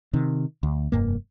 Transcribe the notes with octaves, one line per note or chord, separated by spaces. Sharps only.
C3 D#3
D2
F1 G2 A#3